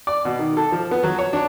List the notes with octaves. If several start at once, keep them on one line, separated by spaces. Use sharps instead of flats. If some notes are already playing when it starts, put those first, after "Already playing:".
D5
B2
D#3
A4
F3
B3
F#3
C#5
D4